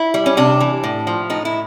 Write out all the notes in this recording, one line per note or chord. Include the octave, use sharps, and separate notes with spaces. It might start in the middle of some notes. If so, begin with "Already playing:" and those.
Already playing: E4
G3
C#4
C3 D4
E3
A2
F3
A2 D#4
E4